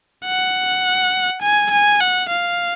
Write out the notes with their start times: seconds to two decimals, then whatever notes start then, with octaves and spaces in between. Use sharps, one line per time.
0.25 F#5
1.41 G#5
1.71 G#5
2.00 F#5
2.29 F5